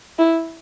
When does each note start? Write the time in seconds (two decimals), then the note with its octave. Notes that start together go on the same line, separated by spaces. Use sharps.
0.19 E4